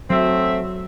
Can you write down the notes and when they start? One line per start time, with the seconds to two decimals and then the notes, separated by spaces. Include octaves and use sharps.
0.10 F#3 A3 C4 E5